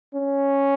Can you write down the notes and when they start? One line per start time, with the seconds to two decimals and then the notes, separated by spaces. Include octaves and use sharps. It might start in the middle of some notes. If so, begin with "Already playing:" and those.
0.14 C#4